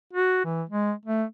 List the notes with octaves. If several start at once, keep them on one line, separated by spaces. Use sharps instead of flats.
F#4
E3
G#3
A3